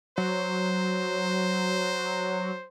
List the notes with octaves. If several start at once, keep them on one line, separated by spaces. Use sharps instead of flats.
F#3 C5